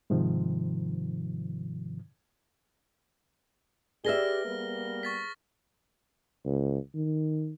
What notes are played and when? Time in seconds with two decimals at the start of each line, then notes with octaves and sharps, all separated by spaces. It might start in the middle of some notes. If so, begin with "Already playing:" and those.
0.10 G#2 C3 D#3 F3
4.05 G4 G#4 B4 D5 E5 F6 A#6 G7
4.45 G3 A#3 B3
5.03 C#6 A6 B6
6.45 C#2
6.94 D#3